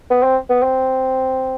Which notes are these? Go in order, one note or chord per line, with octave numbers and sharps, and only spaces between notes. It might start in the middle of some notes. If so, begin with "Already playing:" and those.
B3
C4
B3
C4